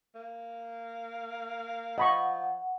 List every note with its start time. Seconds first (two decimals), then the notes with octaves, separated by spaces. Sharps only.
0.15 A#3
1.98 F3 D#5 F#5 B5 C#6